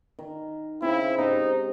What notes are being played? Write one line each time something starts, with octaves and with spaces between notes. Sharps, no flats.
D#3
C#3 C4 E4
G#2 C3 D#4